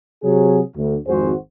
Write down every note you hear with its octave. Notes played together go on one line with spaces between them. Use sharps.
C3 F#3 G#4
D2
G#1 F2 G#2 F#4 G#4 C5